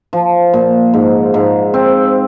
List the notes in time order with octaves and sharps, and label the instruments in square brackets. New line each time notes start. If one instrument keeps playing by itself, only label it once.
[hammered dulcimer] F3
A#2
G#2
G#2
C4